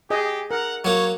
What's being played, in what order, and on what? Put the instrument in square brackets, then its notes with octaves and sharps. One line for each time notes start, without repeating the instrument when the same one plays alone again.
[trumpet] G4 [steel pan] G#4 D#5
[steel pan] A#4 [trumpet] F#5
[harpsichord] F#3 A#3 [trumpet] C#5